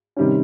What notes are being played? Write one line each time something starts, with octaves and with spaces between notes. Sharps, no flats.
C3 D#3 G3 C#4